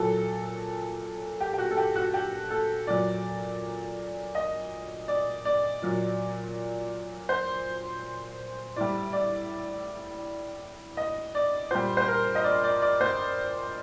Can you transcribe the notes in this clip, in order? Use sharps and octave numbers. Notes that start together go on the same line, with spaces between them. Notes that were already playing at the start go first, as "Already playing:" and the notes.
Already playing: A#2 F#3 A4
G4
G4
F#4
A4
G4
F#4
G4
A4
A#2 F#3 D5
D#5
D5
D5
A#2 F#3
C5
A2 G3 D5
D5
D#5
D5
A#2 G3 C5
C5
A#4
D#5
D5
D5
D5
C5